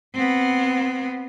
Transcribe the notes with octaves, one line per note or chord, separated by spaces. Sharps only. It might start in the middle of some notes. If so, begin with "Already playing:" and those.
B3 C4